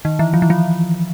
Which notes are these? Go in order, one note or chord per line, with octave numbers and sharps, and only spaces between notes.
D#3
E3
F3
E3
F3